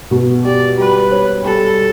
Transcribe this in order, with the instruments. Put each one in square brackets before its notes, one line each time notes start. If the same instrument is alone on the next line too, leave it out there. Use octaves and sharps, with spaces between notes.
[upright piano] B2
[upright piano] G4 [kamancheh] D5
[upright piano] G3 [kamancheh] B4
[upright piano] C#5
[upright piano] G3 [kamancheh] A4